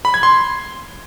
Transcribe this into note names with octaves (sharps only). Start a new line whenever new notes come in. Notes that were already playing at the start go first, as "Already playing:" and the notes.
B5
G#6
C6